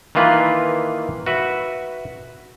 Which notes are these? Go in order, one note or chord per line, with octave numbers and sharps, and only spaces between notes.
D#3 E3 A#3 F4 B4
F#4 B4 E5